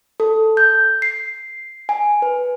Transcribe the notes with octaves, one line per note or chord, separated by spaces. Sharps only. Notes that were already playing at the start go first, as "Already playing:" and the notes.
A4
G6
C7
G#5
B4